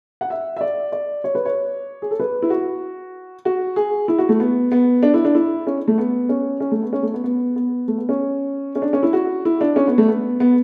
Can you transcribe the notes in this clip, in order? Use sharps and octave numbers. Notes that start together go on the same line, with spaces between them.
F#5
E5
E5
D5
D5
C#5
B4
C#5
G#4
A4
B4
E4
F#4
F#4
G#4
E4
F#4
A3
B3
B3
D4
E4
D4
E4
C#4
A3
B3
C#4
C#4
A3
B3
C#4
A3
B3
B3
B3
A3
B3
C#4
C#4
D4
C#4
E4
F#4
E4
D4
C#4
B3
A3
B3
B3